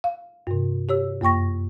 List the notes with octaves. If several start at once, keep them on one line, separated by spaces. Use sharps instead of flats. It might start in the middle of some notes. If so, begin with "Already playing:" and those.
F5
G2 C3
G4 C#5 E6
F#2 A#3 G5 C#6 A#6